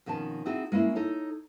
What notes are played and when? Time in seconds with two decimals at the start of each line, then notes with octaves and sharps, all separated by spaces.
0.06 F2 B2 D#3 C#4 A5
0.46 C4 D#4 E4 F#4 G#4
0.72 G#3 A#3 C#4 E4
0.95 D#4 A4 C#5